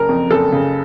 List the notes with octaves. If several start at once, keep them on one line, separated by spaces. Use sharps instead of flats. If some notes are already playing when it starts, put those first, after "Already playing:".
Already playing: F#1 A#4
F2
F#1 A4
C#3